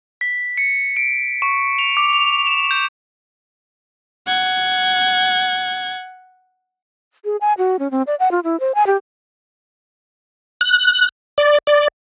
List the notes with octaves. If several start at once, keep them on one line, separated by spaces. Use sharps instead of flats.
B6
C#7
D7
C#6
F7
D6
F7
E7
G6
F#5 G#6
G#4
G#5
F#4
C#4
C4
D5
F#5
F4
E4
C5
G#5
G4
F#6
D5
D5